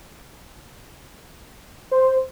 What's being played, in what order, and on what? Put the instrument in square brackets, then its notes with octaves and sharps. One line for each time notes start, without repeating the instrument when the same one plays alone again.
[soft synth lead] C5